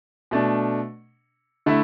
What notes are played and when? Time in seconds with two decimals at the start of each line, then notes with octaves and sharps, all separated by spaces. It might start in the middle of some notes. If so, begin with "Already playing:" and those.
0.31 B2 A3 D4
1.66 D3 A3 E4